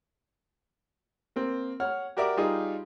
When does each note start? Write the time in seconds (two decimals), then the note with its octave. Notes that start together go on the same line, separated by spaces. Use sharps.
1.36 A#3 C4
1.80 C#5 F#5 F6
2.17 F#4 G4 A#4 D5 E5 D6
2.37 G3 D#4 F4 G4 G#4